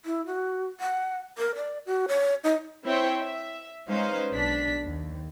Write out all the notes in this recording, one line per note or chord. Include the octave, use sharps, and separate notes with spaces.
E4
F#4
F#5
A#4
D5
F#4
C#5
D#4
C4 E4 C5 C#5 E5 G5
E5
G#3 C#4 D#4 B4 C5 F5
B1 D4 B6
D#2